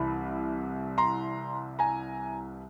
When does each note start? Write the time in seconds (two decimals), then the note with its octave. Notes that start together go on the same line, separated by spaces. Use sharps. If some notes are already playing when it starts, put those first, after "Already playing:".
Already playing: C2 C3 E3 G3 B5
0.98 A#5 C6
1.79 G#5 A#5